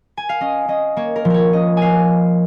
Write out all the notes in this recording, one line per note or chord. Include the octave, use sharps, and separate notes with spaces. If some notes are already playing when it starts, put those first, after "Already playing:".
G#5
F5
C#4 D#5
C#4 D#5
A#3 C#5
A#4
F3
A#4 C#5
C#4 D#5
C#4 F5 G#5